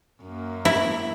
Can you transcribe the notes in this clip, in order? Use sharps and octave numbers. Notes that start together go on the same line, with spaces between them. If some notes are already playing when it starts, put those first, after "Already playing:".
F#2 A#3
E4